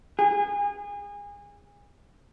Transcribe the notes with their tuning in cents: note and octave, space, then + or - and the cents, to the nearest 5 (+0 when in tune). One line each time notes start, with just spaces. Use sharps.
G#4 -30